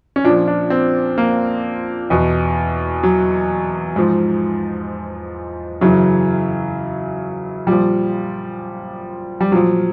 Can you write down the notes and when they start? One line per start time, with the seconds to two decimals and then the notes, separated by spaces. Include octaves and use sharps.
0.16 C#4
0.24 A#2 F3 D4
0.48 D4
0.70 C4
1.18 A#3
2.10 E2 B2
3.03 F#3
3.96 G#2 F3
5.81 F#2 C#3 E3 F#3
7.67 A#2 F3 G3
9.41 G3
9.52 A#2 F3 F#3